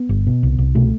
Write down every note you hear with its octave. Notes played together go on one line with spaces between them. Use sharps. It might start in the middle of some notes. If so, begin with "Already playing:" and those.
Already playing: B3
G1
B2
C2
C2
B2 A3